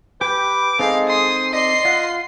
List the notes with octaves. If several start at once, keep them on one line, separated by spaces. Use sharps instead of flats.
G4 B4 G5 D6
G#3 C4 D#4 A4 F5
C6 D#6
D5 D#5 C6 C7
F4 F#5